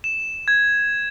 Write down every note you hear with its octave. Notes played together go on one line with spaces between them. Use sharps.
E7
G#6